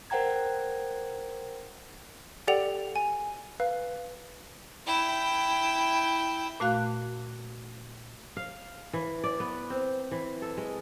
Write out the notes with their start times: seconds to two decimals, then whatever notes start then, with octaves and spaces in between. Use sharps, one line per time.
0.10 A#4 C5 F#5 G5 A#5 G#6
2.48 G4 A4 D5 F#5 G5 F7
2.96 G#5
3.60 B4 F5
4.86 E4 G5
6.60 A#2 A3 F#4 F5 F#6
8.37 F5
8.93 E3
9.24 D5
9.40 B3
9.70 C4
10.11 E3
10.42 A4
10.57 G#3